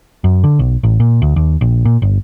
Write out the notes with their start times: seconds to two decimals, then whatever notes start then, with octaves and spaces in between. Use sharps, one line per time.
0.24 F#2
0.44 D3
0.59 B1
0.83 A1
1.00 A#2
1.22 D2
1.36 D#2
1.61 A#1
1.85 A#2
2.02 G1